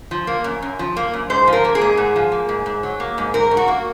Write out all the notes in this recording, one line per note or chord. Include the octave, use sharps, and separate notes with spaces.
F3
A#3
F#2
F#2
F3
A#3
F#2
G#2 C5
F3
A#4
A#3
G#4
G#2
G#2
F3
A#3
G#2
G#2
F#3
A#3
G#2
G#2 A#4
F#3
F#4
A#3